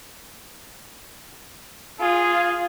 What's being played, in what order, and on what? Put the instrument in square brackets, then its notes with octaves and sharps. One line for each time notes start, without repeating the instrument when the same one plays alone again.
[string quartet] F4 [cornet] G#4